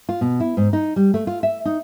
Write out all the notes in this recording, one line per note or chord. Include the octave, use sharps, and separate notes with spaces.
F4
B2
E4
G#2
D#4
G3
A3
F4
E5
D#4